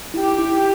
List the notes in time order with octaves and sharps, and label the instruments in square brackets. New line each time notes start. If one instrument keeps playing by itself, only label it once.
[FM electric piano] E4 [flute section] G4
[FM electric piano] E4